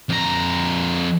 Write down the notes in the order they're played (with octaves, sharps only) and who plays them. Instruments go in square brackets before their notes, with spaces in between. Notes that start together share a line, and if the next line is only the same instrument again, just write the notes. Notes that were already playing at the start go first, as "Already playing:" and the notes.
[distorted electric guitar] F2 A#5